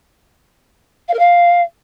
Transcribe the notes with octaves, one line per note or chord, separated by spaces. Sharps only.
F5
A#4
F5